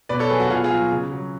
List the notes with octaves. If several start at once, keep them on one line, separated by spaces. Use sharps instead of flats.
B2 B4 D5
A4 C#5
F#3 G#4 B4
F#4 A4
B2 F4 G#4
F4 G#4
F#3
C#3
F#3